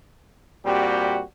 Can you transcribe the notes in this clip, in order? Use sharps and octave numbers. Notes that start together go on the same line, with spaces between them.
A#2 G3 C4 F#4 G4